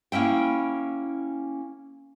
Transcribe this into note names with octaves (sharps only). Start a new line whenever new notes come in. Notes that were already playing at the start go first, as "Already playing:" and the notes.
A#3 C#4 E4 G5